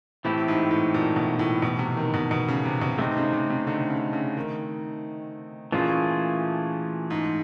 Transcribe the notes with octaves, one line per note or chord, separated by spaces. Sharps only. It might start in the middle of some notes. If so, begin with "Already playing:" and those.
A2 E3 A3 C4 E4 G4
G#2
A2
A#2
B2
A2
B2
C3
D#3
B2
B2
C#3
C3
B2
C3 A3 C4 D#4
C#3
C3
C3
D3
C#3
C#3
D#3
A#2 E3 A3 C#4 F4 G#4
G#2